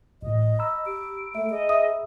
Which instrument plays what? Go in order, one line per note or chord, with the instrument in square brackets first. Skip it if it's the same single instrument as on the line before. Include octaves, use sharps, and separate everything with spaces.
[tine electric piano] A1 A2 [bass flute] D#5
[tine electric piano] A#5 B5 E6
[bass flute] G4 [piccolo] D7
[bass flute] A3 [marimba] E5
[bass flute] G#4 [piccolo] D#5
[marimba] E5 D#6